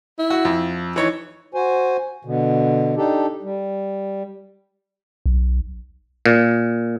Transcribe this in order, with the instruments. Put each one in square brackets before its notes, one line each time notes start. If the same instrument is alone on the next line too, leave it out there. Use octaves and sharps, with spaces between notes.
[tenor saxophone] E4
[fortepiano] F#4
F2
[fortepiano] E3 C#5 [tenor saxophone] D#4
[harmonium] F#4 C5 G#5
B2 D3
D4 D#4 G4 A4
G3
[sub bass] B1
[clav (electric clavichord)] A#2